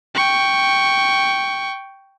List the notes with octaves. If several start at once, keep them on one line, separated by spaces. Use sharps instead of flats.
G5 C#6